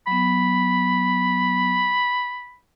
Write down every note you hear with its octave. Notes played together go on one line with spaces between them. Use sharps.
F#3 B3 B5